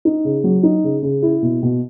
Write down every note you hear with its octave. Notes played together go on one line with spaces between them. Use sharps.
D#4
C#3
F#3
D#4
C#3
C#3
E4
B2
B2